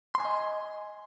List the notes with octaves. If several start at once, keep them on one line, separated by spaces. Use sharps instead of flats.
D#5 G#5 C6